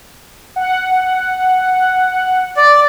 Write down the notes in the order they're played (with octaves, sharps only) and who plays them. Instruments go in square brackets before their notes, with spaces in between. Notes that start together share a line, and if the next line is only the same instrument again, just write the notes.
[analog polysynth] F#5
[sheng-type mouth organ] D5